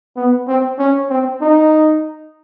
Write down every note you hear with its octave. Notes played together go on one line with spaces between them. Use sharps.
B3
C4
C#4
C4
D#4